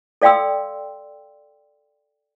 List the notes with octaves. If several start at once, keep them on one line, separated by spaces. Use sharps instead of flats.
A4 D5 F5 G5 C6 E6